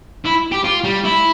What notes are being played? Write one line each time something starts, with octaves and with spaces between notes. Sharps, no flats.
E4
G4
F4
G3
E4